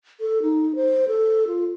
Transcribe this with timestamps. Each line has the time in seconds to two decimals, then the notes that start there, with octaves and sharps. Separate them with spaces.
0.20 A4
0.42 D#4
0.75 C5
1.08 A4
1.47 F4